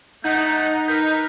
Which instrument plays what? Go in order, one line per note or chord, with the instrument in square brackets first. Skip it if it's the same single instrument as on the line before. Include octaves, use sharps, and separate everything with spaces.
[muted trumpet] A3 [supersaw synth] D#4 [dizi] F#5 [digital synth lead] G6
[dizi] A#4 [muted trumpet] B4 [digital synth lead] G6